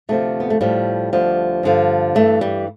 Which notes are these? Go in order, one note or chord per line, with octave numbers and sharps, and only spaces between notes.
D2 C3 F3 A3
B3
A3
A2 F3 G3
D2 D3 F3
G2 D3 F3
G2 E3 A3
G3